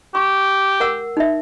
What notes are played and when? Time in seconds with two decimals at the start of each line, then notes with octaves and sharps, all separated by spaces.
0.15 G4 C#6
0.80 A#4 F#5 E6
1.17 D#4 E5